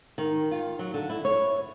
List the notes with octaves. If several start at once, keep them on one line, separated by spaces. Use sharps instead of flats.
D#3
F4
F#3
D3
E4
C#5